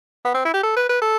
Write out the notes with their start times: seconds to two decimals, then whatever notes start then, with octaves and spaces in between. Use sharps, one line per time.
0.25 B3
0.34 C4
0.45 E4
0.54 G4
0.63 A4
0.76 B4
0.89 B4
1.02 A4